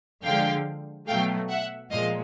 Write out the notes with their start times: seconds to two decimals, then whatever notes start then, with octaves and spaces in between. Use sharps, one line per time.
0.24 D3 F3 G#3 F5 G5
1.07 B2 F#3 A3 F5 G5
1.50 E5 F#5
1.91 A#2 F3 G#3 D#5 F5